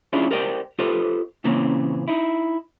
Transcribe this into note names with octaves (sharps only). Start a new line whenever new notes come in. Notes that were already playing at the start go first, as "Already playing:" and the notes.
C#4 D4 E4 F4 G#4 D5
G4 A#4 C5 D5 D#5 G5
F4 G4 A4 B4 C5 D#5
A#2 C#3 E3 A#3 C4 C#4
D#4 E4